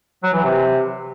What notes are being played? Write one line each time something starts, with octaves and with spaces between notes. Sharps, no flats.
F#3
E3
C3